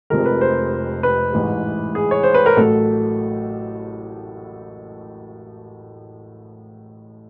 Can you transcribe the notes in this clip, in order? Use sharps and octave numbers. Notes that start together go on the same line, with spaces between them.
F1 F2 C3 F3 G#3 A#4
B4
C5
B4
A1 G#2 E3
G#4
C#5
C5
B4
A#4
A1 A2 F#3 A4